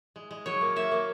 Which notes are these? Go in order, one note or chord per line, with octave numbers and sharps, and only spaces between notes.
G#3
G#3
F#3 C#5
A#3
A#3 E5
A#3